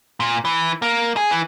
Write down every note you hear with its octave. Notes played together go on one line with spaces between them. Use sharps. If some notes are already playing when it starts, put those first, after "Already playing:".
A#2
E3
A#3
G#4
E3